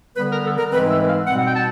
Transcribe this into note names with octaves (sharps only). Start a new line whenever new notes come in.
D3 G3 B3 B4
A#4
A4
A#4
G#2 E3 G#3 C4 B4
E5
F5
B2 G3 C4 F#5
G5
A5